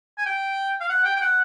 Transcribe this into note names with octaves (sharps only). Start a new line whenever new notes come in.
G#5
G5
F5
F#5
G5
G5
F#5